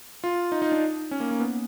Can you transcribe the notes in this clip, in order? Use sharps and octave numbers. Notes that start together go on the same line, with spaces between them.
F4
D#4
D#4
D4
C#4
A#3
A#3
B3